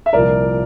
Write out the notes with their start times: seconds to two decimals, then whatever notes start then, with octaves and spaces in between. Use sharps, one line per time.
0.06 E5
0.13 C2 A#2 F3 A#4 D5